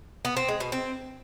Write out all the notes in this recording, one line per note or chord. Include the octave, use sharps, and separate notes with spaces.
B3
C4
G#3
B2
C4